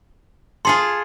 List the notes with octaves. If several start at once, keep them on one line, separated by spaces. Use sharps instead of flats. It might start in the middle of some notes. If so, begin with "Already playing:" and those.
F4 G#4 A4 C6